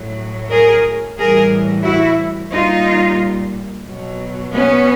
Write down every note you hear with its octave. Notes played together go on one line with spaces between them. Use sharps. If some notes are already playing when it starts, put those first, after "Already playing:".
Already playing: A2 F#3
G#4 A#4
A2 E3 G3 G#4 A#4
E4 F#4
A#2 G3 D#4 F4
B2 F#3
B3 C#4